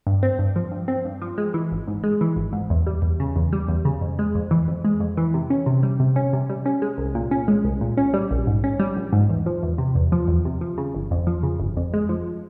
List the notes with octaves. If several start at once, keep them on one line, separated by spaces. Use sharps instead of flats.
G2
C4
G2
F3
G2
C4
G2
F3
G#3
E3
G#1
G#2
G#3
E3
G#1
G#2
E2
G3
E2
C#3
E2
G3
E2
C#3
F2
G#3
F2
E3
F2
G#3
F2
E3
C3
C#4
C3
G3
C3
C#4
C3
G3
C#4
G#3
C2
A#2
C#4
G#3
C2
A#2
C#4
G3
A#1
G#2
C#4
G3
A#1
G#2
E2
F3
E2
C3
E2
F3
E2
C3
F3
C#3
G1
F2
F3
C#3
G1
F2
G#3
F3